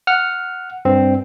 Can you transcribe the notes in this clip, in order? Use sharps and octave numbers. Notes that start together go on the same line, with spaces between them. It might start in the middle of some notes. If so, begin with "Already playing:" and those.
F#5 F6
G2 C4